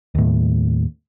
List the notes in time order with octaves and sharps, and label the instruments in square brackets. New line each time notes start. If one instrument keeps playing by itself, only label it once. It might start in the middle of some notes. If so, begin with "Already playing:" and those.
[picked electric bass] D#2 A2